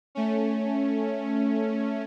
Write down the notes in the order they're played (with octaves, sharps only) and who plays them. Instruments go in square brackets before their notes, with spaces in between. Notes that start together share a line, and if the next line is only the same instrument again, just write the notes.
[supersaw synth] A3 C#4